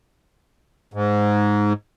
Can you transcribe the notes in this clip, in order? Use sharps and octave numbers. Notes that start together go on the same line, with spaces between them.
G#2